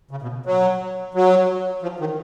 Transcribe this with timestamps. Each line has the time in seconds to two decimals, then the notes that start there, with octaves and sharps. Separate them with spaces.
0.11 C#3
0.22 B2
0.46 F#3
1.14 F#3
1.82 F3
2.00 D#3